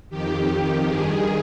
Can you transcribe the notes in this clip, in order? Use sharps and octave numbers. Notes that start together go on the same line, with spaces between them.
F2 D#3 G4
G2 D#3 G#4